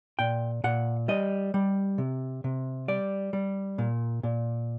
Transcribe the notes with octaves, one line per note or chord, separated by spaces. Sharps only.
A#2 G5
A#2 F#5
G3 D#5
G3
C3
C3
G3 D5
G3
A#2
A#2